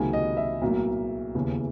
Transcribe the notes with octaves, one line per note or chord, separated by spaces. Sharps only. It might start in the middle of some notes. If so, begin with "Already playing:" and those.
Already playing: C#2 C3 D#3 F#3 A#3 G#5
D#5
E5
B1 A2 F#3 A#3
E1 D#2 C#3 E3